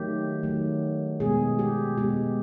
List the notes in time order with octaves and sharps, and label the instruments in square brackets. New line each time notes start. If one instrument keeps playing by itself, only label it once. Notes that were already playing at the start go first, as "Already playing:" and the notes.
Already playing: [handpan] D#3 F#3 A3 G4
D#3 F#3 A3
B2 G#3 B3 G#4
G4
B2 G#3 B3 G4